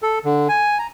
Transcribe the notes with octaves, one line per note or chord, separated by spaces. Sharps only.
A4
D3
G#5
A#5